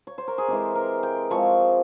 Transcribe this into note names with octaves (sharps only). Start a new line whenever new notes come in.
C#5
C5
A#4
G#4
E3 G#3 C4 G4
A#4
G5
F3 G#3 C4 C#6